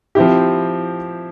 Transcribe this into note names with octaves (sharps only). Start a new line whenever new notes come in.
F3 C4 E4 G4